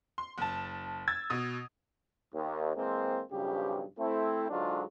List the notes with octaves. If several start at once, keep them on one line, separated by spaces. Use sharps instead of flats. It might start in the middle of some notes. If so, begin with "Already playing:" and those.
C6
F#1 A5
E6 G#6 A6
B2 D#6
D#2
E3 G#3 A#3 C4
B1 G2 C#3 F3 G4
A3 C4 E4
G#2 D3 F#3 G#3 D4 F4